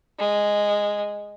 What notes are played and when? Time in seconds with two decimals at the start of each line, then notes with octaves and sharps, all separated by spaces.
0.19 G#3